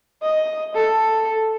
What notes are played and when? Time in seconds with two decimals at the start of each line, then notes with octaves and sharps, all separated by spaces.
0.22 D#5
0.75 A4